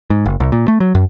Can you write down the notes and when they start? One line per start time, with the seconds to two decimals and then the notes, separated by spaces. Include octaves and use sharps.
0.10 G#2
0.25 F#1
0.40 C2
0.52 A#2
0.68 A3
0.80 F#3
0.95 F#2